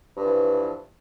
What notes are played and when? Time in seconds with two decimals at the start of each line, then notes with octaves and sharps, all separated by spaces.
0.16 G2
0.20 F3
0.24 E3